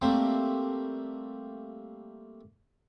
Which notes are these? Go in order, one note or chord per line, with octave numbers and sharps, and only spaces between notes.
G3 A3 A#3 C4 C5